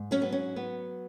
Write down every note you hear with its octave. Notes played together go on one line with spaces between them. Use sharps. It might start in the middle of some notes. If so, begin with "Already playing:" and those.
Already playing: G#2
F#3 C#4
B3
C#4
B3